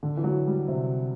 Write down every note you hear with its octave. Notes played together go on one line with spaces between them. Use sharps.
D3
E3
F#3
G3
C3